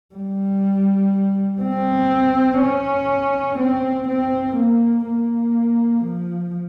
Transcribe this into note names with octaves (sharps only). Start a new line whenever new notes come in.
G3
C4
C#4
C4
C4
A#3
A#3
F3